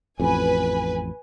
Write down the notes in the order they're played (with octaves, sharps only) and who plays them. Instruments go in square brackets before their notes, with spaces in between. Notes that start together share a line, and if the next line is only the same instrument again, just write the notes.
[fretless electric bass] A1 F2 [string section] B4 G#5